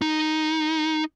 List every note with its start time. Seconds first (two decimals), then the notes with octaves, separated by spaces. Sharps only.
0.02 D#4